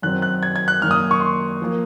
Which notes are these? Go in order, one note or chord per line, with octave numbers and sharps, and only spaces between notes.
F#2 D#3 F#3 C4 F#6
F#6
G#6
G#6
F#6
F#2 D#3 A#3 F6
D#6
C#6
C6
F3 A#3